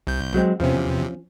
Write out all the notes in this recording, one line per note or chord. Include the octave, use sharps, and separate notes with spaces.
C2 G6
F#3 G#3 C4
E2 C3 F3 C4 C#4